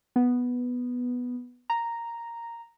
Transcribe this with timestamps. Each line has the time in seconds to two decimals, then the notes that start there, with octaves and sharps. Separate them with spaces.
0.16 B3
1.70 A#5